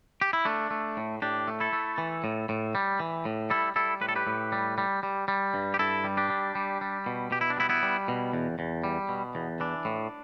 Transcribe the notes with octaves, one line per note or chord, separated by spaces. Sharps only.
G4
E4
A3 D4
A3
A2
A2 D4 G4
A3
E4 A4
A3
E3
A2
A2
G3
E3
A2
G3 E4 A4
G3 E4 A4
A2 B4
A4
G4 B4
A2
G3
G3
G3
G3
G2
G4
G2 E4 A4
G3
D4 G4
G3
G3
G3
B2
B2 G4
E4
D4
G3 B3 E4
B3 E4
G3
B2
E2
E2
G3
B2
E2
E3 D4
A2